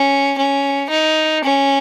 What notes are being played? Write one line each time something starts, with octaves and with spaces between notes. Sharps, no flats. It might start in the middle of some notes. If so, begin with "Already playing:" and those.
Already playing: C#4
C#4
D#4
C#4